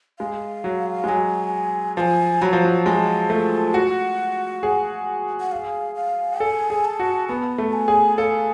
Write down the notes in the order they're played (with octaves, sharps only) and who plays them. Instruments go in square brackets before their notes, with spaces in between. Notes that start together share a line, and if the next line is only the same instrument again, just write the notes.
[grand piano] G#3 [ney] F5
[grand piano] F#3
G#3
[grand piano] F#3 [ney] G#5
[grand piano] F3 [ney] G#5 A5
[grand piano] F#3 [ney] B5
[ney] A5
[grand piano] F3
F#3
[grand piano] G#3 [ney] A5
[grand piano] A3
[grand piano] F#4 [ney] F#5
[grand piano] G#4
[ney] F#5
F5
F5
[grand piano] A4 [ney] G#5
[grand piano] G#4
[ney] A5
[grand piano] F#4
[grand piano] B3 [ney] A5
[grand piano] A3
[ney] G#5
[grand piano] G#4
[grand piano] A4 [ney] F5